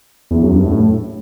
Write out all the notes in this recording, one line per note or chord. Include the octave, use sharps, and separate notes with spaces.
E2
F#2
G2
A2